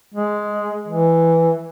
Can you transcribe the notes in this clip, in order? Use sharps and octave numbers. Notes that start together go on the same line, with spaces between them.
G#3
E3